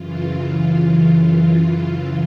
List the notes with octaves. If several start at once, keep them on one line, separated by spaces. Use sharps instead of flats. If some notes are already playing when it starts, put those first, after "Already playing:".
Already playing: F#2 C#3 E3 F4
F4
F4